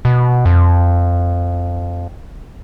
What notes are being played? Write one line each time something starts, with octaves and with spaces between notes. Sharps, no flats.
B2
F2